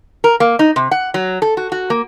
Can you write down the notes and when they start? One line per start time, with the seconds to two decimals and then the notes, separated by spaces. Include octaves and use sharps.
0.24 A#4
0.40 A#3
0.59 D#4
0.76 C3
0.91 F#5
1.14 F#3
1.42 A4
1.57 F#4
1.72 F#4
1.90 A#3